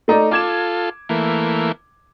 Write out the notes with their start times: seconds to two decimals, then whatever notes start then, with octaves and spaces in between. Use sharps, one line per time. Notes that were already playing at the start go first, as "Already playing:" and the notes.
0.08 A3 D#4 D5
0.31 F4 A4 D6 G#6 E7
1.09 E3 A3 A#3